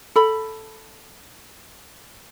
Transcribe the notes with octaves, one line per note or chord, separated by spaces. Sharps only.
A4 B5